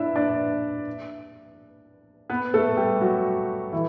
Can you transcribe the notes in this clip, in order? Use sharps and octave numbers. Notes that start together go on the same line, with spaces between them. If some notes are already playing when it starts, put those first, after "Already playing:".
Already playing: D4 E4 D5 E5
D4 D5
B3 B4
A3 A4
G3 G4
F#3 F#4
E3 E4